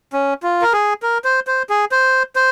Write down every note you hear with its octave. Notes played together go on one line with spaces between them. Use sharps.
C#4
F4
A#4
G#4
A#4
C5
C5
G#4
C5
C5